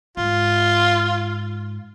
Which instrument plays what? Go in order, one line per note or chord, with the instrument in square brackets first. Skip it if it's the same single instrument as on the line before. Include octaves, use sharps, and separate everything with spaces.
[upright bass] G#2 [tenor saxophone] F4